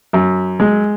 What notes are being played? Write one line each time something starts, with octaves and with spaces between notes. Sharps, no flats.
F#2
G#3